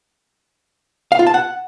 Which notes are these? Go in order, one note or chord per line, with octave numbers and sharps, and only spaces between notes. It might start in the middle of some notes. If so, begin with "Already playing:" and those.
F5
F4
A5
F#5